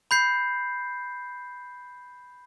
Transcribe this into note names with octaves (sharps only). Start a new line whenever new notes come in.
B5 G6 C7